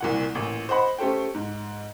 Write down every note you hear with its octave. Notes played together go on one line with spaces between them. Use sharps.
C2 A#2 F#5
A1 A#2
C5 D#5 F#5 B5
A3 C#4 G4 A4 C5 G5
G#2